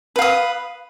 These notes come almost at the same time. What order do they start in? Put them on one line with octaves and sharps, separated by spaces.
B4 F5 D#6